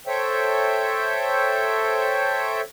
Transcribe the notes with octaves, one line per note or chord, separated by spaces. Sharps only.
A4 C5 C#5 E5 G5